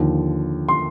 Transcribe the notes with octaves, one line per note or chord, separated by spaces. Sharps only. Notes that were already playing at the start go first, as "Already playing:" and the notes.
Already playing: D#2 D3 F3
C6